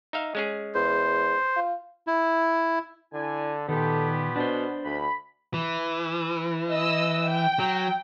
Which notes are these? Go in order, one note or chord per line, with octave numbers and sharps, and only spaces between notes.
D#4 E5 F5
G#3 C#4 G#4
E2 C5
F4
E4
D3 E4 D5 G#5
A#2 D#3 B3 G4 A4
B2 D4 C5
D2 B5
E3
D#5 E6
G5
F#3